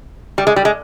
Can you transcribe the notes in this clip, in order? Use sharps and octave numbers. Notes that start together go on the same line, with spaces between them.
G3
G#3
G3
G#3